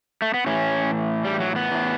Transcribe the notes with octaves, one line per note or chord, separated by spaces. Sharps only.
A3
B3
A2 E3 C#4
G3
F#3
B3
A2 E3